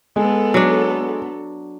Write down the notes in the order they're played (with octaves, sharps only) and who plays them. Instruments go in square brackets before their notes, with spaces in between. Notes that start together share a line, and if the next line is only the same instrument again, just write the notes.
[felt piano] G#3 [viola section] B3 A4
[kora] F#3 D4